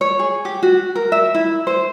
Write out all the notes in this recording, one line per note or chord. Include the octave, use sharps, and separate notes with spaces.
C#5
G#4
G4
F#4
A#4
E5
E4
C5